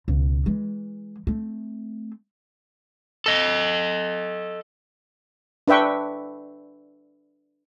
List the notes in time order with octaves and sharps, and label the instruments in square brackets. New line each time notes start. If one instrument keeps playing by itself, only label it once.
[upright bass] C#2 B2
E3 G#3
A3 C4
[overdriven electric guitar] A4 D#5
[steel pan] D4 B4 E5 G5 C#6